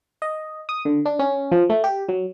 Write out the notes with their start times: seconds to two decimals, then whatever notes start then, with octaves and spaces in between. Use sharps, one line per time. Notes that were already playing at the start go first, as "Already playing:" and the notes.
0.22 D#5
0.69 D#6
0.85 D3
1.05 D4
1.19 C#4
1.52 F3
1.70 A3
1.84 G4
2.09 F#3